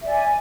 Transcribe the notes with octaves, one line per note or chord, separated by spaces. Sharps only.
D5 E5 G#5